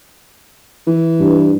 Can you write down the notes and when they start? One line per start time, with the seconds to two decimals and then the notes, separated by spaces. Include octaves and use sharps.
0.87 E3
1.20 G2